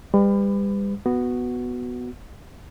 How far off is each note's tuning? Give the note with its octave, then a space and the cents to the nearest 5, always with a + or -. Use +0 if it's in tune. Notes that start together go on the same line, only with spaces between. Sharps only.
G3 +35 B4 +30
B3 +0 F#4 +0